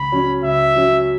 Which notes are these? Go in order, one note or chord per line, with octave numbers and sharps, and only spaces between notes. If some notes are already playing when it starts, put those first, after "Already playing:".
Already playing: C#2 B5
C#3 F#3 C#4
C#2 E5
C#3 F#3 C#4